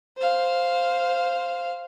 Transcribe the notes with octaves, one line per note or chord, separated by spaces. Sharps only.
C5 F5